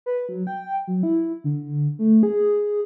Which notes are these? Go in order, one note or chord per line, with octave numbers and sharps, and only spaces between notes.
B4
F#3
G5
F#3
E4
D3
A3
G#4